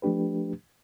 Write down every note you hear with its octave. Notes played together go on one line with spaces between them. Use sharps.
F3 A3 D4 G4 B4